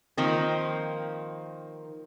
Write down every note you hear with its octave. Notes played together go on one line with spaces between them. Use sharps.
D#3 F3 A#3 C4